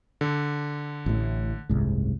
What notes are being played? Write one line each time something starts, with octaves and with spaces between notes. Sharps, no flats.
D3
A1 A2
F#1 C2 G#2